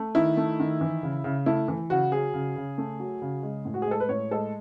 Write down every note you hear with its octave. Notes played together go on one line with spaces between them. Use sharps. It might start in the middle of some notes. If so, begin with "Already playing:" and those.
Already playing: A3
D#3 E4
A3
D#3
E3
C#3
C#3
A3 E4
E3
C#3 F#4
F#3 G#4
C#3
C#3
A3
F#3
C#3
G#3
A2
F#4
G#4
G#3 A4
B4
A2 C#5
G#3 A4